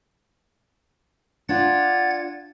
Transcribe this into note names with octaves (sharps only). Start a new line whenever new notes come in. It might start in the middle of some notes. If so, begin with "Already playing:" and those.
D4 F4 F#5 G#6 A6